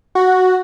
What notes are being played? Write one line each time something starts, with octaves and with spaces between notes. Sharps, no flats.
F#4